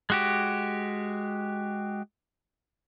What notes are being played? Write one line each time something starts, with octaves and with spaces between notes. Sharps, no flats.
G#3 F#4 G4